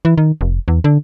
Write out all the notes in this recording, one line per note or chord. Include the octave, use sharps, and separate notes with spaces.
E3
D#3
F1
E2
D3